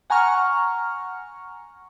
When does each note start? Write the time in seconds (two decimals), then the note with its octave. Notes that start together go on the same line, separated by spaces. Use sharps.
0.10 F#5 G#5 A#5 C#6 F6